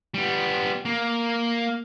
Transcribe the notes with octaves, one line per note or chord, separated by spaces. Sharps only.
G3 B3
A#3